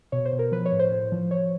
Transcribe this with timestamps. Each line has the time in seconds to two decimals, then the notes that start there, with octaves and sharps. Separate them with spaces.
0.12 B2 C#5
0.25 C5
0.33 B2
0.39 A#4
0.52 F3 B4
0.66 C#5
0.72 A2
0.79 C5
0.92 A2
1.12 F3
1.31 F3 C#5